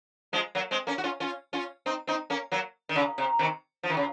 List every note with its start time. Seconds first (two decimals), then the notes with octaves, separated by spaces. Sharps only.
0.33 F3 G#3
0.55 F#3 A#3
0.71 G#3 C4
0.87 A#3 C#4
0.98 F#4
1.04 C#4 F4
1.20 C#4 F4
1.53 C#4 F4
1.86 C4 D#4
2.07 C4 D#4
2.30 A#3 C#4
2.52 F#3 A#3
2.89 D#3
2.96 C#3
3.18 C3
3.39 C3 D#3
3.83 F3
3.90 D#3
3.97 C#3